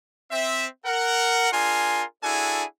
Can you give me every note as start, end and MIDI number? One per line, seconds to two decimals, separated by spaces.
0.32 0.66 60
0.32 0.66 76
0.86 1.49 70
0.86 1.49 78
1.53 2.04 62
1.53 2.04 65
1.53 2.04 68
1.53 2.04 70
1.53 2.04 80
1.53 2.04 84
2.24 2.64 62
2.24 2.64 64
2.24 2.64 66
2.24 2.64 68
2.24 2.64 69
2.24 2.64 80